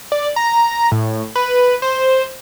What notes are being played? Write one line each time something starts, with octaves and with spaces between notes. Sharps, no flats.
D5
A#5
A2
B4
C5